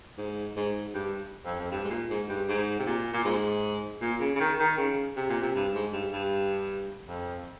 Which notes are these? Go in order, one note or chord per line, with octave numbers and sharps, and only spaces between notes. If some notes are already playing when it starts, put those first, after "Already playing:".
G#2
G#2
G2
F2
F2
G2
G#2
A#2
G#2
G2
G#2
C3
A#2
A#2
G#2
A#2
C#3
C#3
D#3
D#3
C#3
C3
A#2
C3
G2
G#2
G2
G2
F2